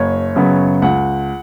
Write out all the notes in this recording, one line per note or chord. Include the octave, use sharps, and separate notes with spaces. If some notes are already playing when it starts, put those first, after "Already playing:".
Already playing: F#1 C#5
F#2 C#3 F#3 B3
C#2 F#5